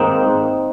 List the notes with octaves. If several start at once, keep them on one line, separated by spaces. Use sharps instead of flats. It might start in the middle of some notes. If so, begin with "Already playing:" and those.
Already playing: G#2 D#3 A#3 C4 D#4